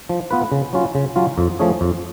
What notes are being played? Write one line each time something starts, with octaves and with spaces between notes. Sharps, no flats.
F3
B3 F4 B4
C#3
F#3 C#4 F4
C#3
F#3 C#4 F4
F2
F3 A3 C#4 G#4
F2